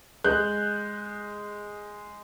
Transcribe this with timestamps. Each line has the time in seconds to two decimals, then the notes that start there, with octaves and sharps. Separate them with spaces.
0.24 G#3 F#6 G6